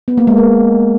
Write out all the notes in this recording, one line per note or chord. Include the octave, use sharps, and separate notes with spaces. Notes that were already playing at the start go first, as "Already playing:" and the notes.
B3
A#3
G#3
A#4